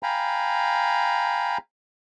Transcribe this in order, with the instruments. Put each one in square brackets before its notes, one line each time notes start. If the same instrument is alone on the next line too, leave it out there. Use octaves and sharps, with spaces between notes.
[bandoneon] F5 G5 G#5 A#5 B5